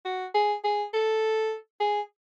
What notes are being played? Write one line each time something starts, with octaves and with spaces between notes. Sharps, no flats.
F#4
G#4
G#4
A4
G#4